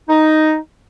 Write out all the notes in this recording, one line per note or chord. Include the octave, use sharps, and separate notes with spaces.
D#4